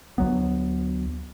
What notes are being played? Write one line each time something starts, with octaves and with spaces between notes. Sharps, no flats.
D2 F#3 B3